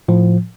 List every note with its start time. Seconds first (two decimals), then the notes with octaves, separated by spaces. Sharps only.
0.08 A2 F3